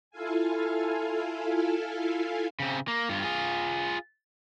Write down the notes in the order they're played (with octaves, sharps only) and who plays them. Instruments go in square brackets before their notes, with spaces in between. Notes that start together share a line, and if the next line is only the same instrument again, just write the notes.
[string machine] E4 F4 A4 F5 G#5
[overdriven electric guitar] C#3 C4
A#3
G2 F4
F4 G#4